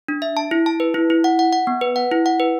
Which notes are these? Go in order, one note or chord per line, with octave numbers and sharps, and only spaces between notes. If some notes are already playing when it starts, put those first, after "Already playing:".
D4
E5
A5
E4
A5
B4
E4
E4
F#5
F#5
F#5
B3
B4
F#5
E4
F#5
B4